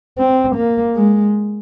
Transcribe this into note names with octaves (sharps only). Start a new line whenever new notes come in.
C4
A#3
G#3